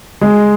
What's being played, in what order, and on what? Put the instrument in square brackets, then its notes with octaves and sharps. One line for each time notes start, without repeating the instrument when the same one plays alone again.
[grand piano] G#3